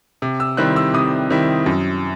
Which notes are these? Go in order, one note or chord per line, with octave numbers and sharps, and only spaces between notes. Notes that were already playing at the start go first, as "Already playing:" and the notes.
C3
E6
D#3 G3 C4 E4 F#6
E6
C3 D#6
D#3 G3 C4 E4
F#2